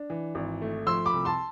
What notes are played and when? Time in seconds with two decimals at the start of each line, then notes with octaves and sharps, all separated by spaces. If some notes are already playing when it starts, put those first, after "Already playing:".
Already playing: D4
0.10 E3
0.35 G#1
0.62 A3
0.87 F3 C6 E6
1.06 B5 D6
1.13 C2
1.25 A5 C6